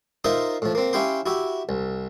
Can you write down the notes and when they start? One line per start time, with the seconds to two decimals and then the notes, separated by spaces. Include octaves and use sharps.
0.24 D#4 F4 A#4 C5 E5 C6
0.62 A2 F3
0.75 A#3 C4
0.93 C#4 E4 G4 F5 G5 C6
1.26 E4 F#4 G4 E5
1.69 C2